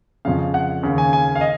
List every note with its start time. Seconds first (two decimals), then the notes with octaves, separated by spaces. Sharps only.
0.25 F2 C#3 F5
0.54 F#5
0.83 D#2 C#3
0.98 G#5
1.13 G#5
1.35 F5
1.41 D#5